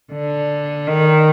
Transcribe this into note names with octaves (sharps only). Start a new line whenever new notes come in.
D3
D#3